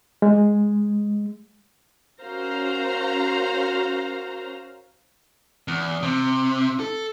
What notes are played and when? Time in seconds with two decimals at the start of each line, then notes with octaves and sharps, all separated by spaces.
0.22 G#3
2.23 C#4 F#4 A#4 C5 F5 A#5
5.68 E2
6.03 C3
6.80 A4